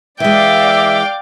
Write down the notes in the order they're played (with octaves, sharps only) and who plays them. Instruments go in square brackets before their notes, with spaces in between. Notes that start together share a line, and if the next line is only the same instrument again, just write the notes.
[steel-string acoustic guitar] E3 G#3 [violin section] D5 F5 D6 [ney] E5 [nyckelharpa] G5